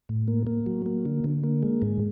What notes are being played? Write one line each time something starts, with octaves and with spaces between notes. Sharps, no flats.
A2
A#3
A#3
F#3
A#3
D3
D3
A#3
G#3
G#2